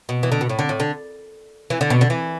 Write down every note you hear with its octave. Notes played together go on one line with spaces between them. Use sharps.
B2
E3
D3
B2
A2
D3
A2
D3
E3
D3
B2
D3
E3